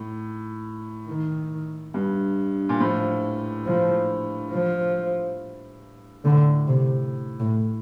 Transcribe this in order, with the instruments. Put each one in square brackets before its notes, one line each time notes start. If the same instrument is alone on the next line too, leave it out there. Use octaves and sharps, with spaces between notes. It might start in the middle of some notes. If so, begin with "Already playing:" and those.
Already playing: [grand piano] A2
[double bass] D#3
[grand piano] G2
A#2
[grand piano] A2 [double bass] F3
[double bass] F3
F3
[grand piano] A2 [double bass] D3
[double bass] C3
A2